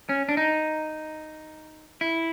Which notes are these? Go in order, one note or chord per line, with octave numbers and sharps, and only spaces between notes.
C#4
D4
D#4
E4